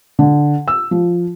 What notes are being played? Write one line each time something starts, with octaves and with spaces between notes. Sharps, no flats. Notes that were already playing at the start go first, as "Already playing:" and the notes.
D3
E6
F3